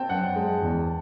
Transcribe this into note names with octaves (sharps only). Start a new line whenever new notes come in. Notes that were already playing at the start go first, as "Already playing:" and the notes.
Already playing: C4 G5 A5
F#2 F#5
G#3
E2